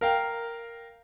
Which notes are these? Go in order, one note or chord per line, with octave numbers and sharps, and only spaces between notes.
A#4 F5 G5